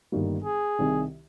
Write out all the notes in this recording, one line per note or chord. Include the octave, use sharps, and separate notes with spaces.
G1 G2 D#3 G3 A#3
G#4
C2 C3 D#3